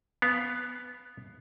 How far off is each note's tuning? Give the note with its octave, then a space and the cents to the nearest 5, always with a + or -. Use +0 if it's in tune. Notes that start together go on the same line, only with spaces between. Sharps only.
B3 +0 F5 +0